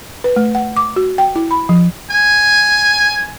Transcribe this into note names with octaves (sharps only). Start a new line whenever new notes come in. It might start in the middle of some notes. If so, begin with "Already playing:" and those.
B4
A3
F#5
D6
F#4
G5
E4
B5
F3
G#5